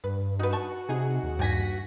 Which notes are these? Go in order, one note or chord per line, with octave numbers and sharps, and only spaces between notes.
G2 B4
D#4 F#4 B4
A5 C#6
C3 D#4 G#4
D#2
G2 G4 G#5 A#6 B6